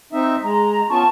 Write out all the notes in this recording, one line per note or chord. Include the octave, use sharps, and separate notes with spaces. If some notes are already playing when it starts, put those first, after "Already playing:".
C4 D#4 E5
G#3 A#5
B3 C#4 F4 A5 C#6